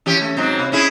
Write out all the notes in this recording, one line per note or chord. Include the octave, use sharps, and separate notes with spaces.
E3 C#4 G4
A3
G#2 F#3 C4
C3
C#4 E4 G#4